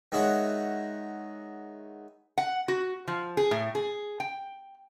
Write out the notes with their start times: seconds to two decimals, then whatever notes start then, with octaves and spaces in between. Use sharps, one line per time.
0.12 D#3 G#3 E4 F#4 C#5
2.38 F#5
2.68 F#4
3.08 F3
3.37 G#4
3.51 A2
3.75 G#4
4.20 G5